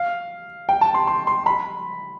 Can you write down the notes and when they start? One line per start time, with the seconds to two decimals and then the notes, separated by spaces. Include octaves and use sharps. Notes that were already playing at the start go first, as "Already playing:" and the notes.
Already playing: F5
0.69 G5
0.81 A5
0.94 C6
1.07 C6
1.27 C6
1.46 B5